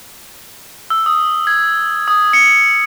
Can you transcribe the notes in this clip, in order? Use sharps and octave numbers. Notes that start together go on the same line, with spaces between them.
E6
D#6
G#6
D#6
C#7